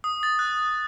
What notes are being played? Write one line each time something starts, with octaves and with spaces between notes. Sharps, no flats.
D#6
A6
F#6